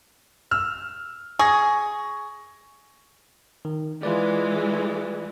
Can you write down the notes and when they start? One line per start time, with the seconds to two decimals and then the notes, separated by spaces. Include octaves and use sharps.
0.51 E6 F6
1.39 G#4 C#6 G#6 A#6
3.65 D#3
4.03 E3 G#3 F4 B4 D5